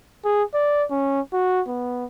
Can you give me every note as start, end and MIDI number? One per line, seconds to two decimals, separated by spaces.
0.25 0.43 68
0.54 0.84 74
0.90 1.20 61
1.33 1.62 66
1.68 2.05 59